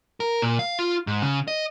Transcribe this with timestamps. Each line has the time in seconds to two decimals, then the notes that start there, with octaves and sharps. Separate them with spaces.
0.20 A#4
0.42 A#2
0.59 F5
0.79 F4
1.07 G#2
1.22 C#3
1.48 D#5